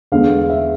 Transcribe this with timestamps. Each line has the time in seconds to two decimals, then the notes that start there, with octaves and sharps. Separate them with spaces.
0.12 E2 D3 G#3 B3 F5
0.50 E5